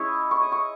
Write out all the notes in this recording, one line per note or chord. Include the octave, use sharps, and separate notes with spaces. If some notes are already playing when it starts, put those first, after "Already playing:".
Already playing: G#3 C#4 E4 C#6 D#6
C#6
D#6
C#6